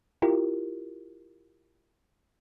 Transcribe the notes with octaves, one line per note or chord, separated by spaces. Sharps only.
E4 F4 G4 A#4